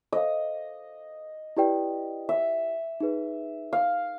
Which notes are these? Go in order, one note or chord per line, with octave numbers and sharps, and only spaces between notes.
A4 C5 D#5 F5
E4 G4 B4 D5 G5
E5
D#4 G#4 B4
F5